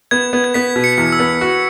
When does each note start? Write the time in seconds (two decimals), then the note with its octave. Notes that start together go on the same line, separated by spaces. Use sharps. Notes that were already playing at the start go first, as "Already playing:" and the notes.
0.11 B3 G#6
0.33 B3
0.44 G#6
0.54 B3 B6
0.76 B2
0.84 C#7
0.98 E2
1.12 E6
1.20 B3
1.41 F#4